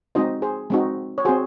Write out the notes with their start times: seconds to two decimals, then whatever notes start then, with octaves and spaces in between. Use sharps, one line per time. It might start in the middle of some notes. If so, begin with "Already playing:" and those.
0.15 G#3 C4 D#4 F#4 C5 D#5
0.42 G#4 C5
0.70 G#3 C4 D#4 F#4
1.18 C#5
1.25 C4 F#4 G#4 C5